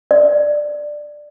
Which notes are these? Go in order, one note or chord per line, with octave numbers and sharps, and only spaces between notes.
D5